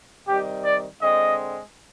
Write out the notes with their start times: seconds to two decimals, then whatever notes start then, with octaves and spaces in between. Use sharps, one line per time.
0.27 C3 D#3 G3 G4
0.64 D5
1.01 D3 G#3 C4 D#5